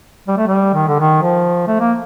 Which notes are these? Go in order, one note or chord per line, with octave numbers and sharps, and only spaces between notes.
G3
A3
G3
D#3
D3
D#3
F3
A3
A#3